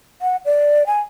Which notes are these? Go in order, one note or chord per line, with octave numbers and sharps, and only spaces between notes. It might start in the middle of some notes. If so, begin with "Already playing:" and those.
F#5
D5
G#5